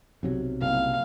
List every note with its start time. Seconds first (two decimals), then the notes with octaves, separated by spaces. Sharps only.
0.23 B1 C3 F#3
0.61 F#1 C2 F5